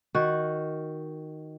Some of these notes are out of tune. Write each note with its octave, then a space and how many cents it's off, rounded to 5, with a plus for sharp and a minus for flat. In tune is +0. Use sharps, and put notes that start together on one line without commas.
D#3 +0 F#4 +0